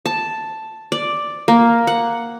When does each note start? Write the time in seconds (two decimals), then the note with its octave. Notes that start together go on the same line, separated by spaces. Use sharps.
0.06 A5
0.92 D5
1.48 A#3
1.87 F#5